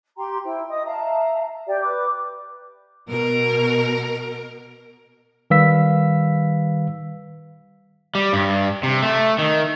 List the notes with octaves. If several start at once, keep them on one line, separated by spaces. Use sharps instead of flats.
G4 G5 A#5 C6
E4 C5 G5
D#5 D#6
E5 F5 A5 A#5
G4 D5
B4 D6
B2 A#4
D#3 G3 B4 F5 E6 B6
G3
G2
C3
A3
D#3